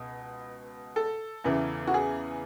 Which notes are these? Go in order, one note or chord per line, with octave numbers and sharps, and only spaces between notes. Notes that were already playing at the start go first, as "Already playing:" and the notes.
Already playing: C#2 B2
A4
E2 C#3 E3
F#4
G#4